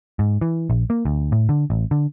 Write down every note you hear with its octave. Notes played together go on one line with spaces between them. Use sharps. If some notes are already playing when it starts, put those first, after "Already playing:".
G#2
E3
A#1
A#3
D2
A2
D3
A1
D3